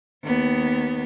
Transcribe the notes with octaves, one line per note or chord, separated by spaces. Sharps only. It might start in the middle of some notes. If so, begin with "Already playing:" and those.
D#2 B3